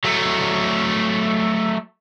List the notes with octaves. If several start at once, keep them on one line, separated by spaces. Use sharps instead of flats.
F#3 A3